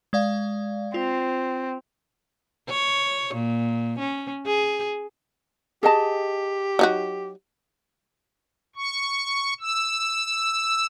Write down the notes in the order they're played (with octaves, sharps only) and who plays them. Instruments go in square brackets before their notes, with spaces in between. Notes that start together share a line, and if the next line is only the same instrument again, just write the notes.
[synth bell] G#3 D5 F5
[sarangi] C4 [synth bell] F4
[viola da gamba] C#5
A#2
C#4
G#4
[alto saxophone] G4 [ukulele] G#4 D#5 A5
[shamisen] F#3 D#4 F#4
[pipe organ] C#6
E6